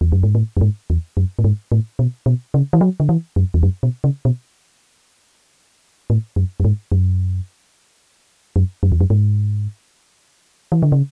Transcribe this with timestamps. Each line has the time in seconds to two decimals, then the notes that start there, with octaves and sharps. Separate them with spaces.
0.01 E2
0.12 F#2
0.23 G#2
0.35 A2
0.57 F#2
0.61 G#2
0.90 E2
1.17 F#2
1.39 A2
1.44 G#2
1.72 A2
1.99 B2
2.26 B2
2.54 C#3
2.73 E3
2.81 F#3
3.00 D3
3.09 E3
3.36 F#2
3.54 E2
3.63 F#2
3.83 B2
4.04 C#3
4.25 B2
6.10 A2
6.36 F#2
6.60 F#2
6.64 G#2
6.92 F#2
8.56 F#2
8.83 F#2
8.92 E2
9.01 F#2
9.10 G#2
10.72 E3
10.83 D3
10.92 C#3